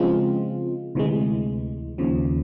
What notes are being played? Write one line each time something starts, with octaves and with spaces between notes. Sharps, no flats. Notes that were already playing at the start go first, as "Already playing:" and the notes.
Already playing: C#3 F3 G#3 C4 F4
D2 C3 E3 G#3
D#2 C#3 F3